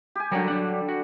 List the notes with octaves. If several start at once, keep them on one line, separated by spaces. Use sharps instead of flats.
G4 G#5
D3 F#3 G3 A#4 C#5
F#3 D4 F#5
F#4